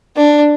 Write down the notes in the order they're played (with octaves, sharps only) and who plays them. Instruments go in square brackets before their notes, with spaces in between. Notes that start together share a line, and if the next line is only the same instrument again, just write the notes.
[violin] D4